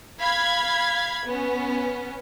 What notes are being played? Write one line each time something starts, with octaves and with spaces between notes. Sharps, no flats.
F5 B5 G#6
B3 C#4